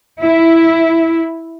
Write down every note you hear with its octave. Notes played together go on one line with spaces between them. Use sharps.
E4